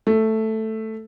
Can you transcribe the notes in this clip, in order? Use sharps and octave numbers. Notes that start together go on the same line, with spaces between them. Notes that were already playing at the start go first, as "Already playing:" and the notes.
A3